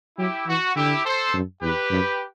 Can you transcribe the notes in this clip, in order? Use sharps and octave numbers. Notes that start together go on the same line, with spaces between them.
F#3 E4 G4
E3 F#4
D3 E4 G4
A4 C5
F#2
E2 G4 B4
F#2